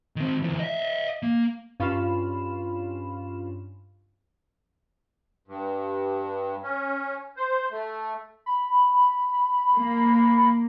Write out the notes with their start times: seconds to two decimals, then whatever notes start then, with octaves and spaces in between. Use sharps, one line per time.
0.16 D#3 C4
0.42 D2 E3
0.59 D#5 E5
1.23 A#3
1.80 G2 C#4 F4 F5 B5 E7
5.48 G2
6.63 C#4
7.37 C5
7.72 A3
8.46 B5
9.76 A#3